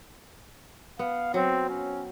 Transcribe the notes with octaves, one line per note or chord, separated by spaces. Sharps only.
B3 F5
F#3 C4
C#4